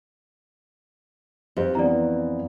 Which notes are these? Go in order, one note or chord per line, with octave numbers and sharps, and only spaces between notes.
F2 G4 C5
E3 B3 D5 A#5